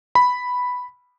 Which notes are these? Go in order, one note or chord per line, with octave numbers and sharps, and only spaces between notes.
B5